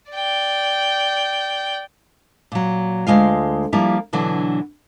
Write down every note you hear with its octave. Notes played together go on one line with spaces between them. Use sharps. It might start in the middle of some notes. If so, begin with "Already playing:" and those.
D5 G5
A#2 F#3
D2 G#3 F4 F5
F3 G3 A#3 E4
B2 D3 E3 F#3 D4